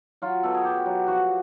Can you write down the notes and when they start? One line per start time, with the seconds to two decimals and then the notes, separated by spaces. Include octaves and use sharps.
0.22 F#3 F4
0.43 B2 A4
0.54 G#4
0.65 B2 G4
0.86 F#3
1.07 F3 F#4